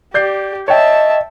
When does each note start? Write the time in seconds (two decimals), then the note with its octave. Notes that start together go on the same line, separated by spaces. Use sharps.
0.14 G4 D5 G6 C7
0.68 C#5 D#5 E5 G5 A5